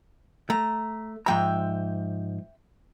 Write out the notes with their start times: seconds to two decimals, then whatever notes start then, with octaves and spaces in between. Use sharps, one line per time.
0.50 A3 A#5
1.26 G#2 F3 E5 G5 A#5